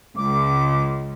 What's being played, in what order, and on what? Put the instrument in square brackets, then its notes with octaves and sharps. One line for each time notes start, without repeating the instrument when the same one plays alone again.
[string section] C#2 [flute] D6